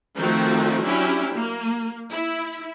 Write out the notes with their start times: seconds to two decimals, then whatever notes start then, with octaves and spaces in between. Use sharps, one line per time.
0.18 D#3 F3 A3 C4 F#4
0.84 F#3 C#4 D4 E4 G4
1.35 A#3
2.12 E4